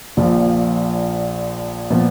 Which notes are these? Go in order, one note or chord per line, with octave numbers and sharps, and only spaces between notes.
A#1 A#2 F3
A#2 F3 B3